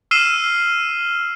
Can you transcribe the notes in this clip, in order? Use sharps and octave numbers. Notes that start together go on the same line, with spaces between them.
E6 F6 C7 D#7 E7 G7